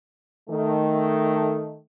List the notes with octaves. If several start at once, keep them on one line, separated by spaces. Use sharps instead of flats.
D#3 A3